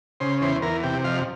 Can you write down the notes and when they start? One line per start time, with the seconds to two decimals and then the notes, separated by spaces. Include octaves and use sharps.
0.20 C#3 C5
0.42 E2 C5
0.62 E2 A#4
0.83 C3 G4
1.04 F2 F5